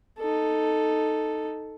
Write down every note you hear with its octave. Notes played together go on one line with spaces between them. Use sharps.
D#4 A4